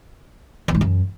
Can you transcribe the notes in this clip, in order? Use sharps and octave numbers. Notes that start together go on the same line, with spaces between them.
E2
G#2
F#2